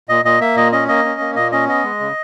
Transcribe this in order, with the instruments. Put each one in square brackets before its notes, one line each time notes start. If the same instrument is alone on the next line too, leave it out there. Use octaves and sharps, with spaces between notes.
[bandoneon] A#2 D#5
A#2 D#5
A#3 E5
A#2 D#5
C#4 D#5
A#3 D#5
C#4
A#3
A#2 D#5
C#4 D#5
B3 D#5
G#3
C#3